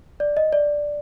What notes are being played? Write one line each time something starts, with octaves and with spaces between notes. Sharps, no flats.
D5
D#5
D5